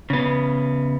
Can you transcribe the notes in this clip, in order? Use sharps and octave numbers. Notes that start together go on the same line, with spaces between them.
C#3 B3